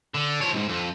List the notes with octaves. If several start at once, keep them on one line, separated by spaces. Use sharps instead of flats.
D3
F3 C#5
C#2 G#2
F2